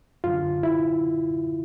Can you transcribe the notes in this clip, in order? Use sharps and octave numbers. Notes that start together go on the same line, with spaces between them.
F#2 D3 F4
E4